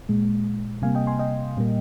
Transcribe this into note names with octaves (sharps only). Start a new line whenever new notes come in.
A#2 G#3
C3 G3 A#3 F5 G#5
D#5 G5
G#5 C6
D#5 G5
A#2 G3 A#3